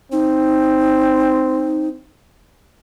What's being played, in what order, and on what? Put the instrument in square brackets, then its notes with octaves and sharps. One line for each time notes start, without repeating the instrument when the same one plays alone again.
[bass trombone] C4 [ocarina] D#4